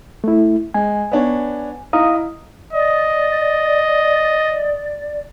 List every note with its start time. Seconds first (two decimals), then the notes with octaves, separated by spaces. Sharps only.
0.24 A3 E4
0.74 G#3 G#5
1.12 B3 D4 C#5
1.93 E4 D#5 F5 A#5 D#6
2.73 D5 D#5